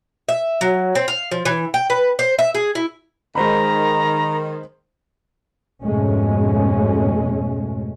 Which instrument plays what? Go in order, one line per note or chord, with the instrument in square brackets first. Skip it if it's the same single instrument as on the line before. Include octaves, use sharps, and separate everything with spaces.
[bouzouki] E5
F#3
C4
F5
F3
E3
G5
B4
C5
E5
G#4
E4
[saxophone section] D#3 [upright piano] G#3 C5 B5 [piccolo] A#5
[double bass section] F2 G#2 B2 G#3 A3 C#4